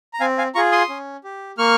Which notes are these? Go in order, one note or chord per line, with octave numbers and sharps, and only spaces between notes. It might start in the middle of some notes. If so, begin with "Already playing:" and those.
A#5
C4 F5 G#5
F5 G#5
F4 G#4 A#5 C#6
C6 D#6
C#4
G4
A#3 C#6 F6